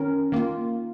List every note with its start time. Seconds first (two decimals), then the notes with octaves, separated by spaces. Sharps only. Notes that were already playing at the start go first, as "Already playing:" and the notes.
Already playing: D#3 C#4 A#4
0.32 D#3 A#3 F4